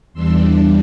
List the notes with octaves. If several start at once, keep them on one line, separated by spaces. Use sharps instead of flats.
E2 E3 G3 D4 C6 E6